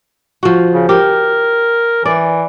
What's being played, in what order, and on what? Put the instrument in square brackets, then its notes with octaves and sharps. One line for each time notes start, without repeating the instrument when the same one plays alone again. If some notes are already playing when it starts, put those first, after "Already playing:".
[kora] F3 F#4
[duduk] C#3
[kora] G4 [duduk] A#4
[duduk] E3 [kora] D5